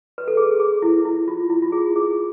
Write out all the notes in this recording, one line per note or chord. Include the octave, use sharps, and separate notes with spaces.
B4
A4
G#4
G#4
E4
E4
F4
E4
F4
G#4
G#4
G#4